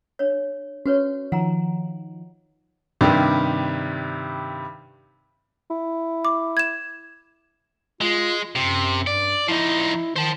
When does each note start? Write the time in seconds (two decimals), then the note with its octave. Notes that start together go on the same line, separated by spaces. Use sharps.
0.19 D4 C#5
0.86 C#4 F#4 B4 C#5
1.32 D#3 F3 F#5 A#5
3.01 G2 C3 D#3 G3
5.71 E4
6.25 D6
6.57 G#6 E7
8.01 G#3 F4
8.56 F#2 C3
9.07 G2 D5
9.48 F3 D#4 E4
10.16 D#3 C5 A5